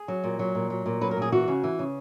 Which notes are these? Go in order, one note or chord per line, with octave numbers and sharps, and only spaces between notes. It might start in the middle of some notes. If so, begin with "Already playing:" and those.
Already playing: G#4
F#3
A#2
F#3
A#2
F#3
A#2
F#3 B4
A#4
A#2
G#4
E3 F#4
C#3
E3
C#3